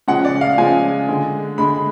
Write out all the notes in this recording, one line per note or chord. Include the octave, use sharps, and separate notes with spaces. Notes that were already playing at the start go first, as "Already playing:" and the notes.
C#3 F3 G#3 F#5
D5
F5
C#3 F3 G#3 G#5
D3 G#3
D3 G#3 B5